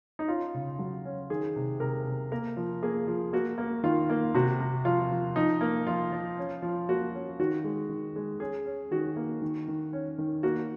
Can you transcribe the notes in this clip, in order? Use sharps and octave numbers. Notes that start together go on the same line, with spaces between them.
D#4
C#4 F4
C#3
F#3
C#4
D#3 G#4
C3
C3 A#4
C3
A#3 A#4
F3
A#3 G#4
F3
A#3 F#4
A#3
D#3 F4
A#3
C3 F#4
C3
F3 F4
F3
F3 D#4
A#3
F3 F4
F3
C#4
F3
A#3 F#4
C#4
D#3 F#4
G#3
D#3
G#3
C#4 G#4
C#4
D#3 F#4
A#3
D#3
D#3
C#4
D#3
A#3 F#4